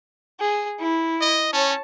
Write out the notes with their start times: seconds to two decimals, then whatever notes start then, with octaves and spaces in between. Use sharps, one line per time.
0.40 G#4
0.79 E4
1.21 D#5
1.53 C#4 C#5 A5